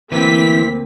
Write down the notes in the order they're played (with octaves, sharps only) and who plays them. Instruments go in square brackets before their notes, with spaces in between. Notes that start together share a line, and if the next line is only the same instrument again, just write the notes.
[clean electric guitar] D2 A#3 B4 [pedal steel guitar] E3 [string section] C4 B6